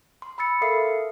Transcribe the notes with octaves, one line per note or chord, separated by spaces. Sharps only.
C6
B5 C6 E6 A6 C#7
A4 A#4 E5 F5 D#6 C7